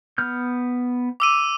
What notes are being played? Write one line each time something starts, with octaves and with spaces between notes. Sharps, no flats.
B3 F6 G6
D6 E6 D#7